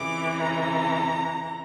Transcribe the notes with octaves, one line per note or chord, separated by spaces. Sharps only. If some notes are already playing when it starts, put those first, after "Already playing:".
Already playing: F2 C#3 E3 D6
A#5